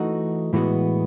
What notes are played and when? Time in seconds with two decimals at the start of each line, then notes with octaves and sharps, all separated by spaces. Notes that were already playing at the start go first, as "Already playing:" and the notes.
Already playing: E3 A3 D#4 F#4
0.53 A2 E3 G#3 B3 F#4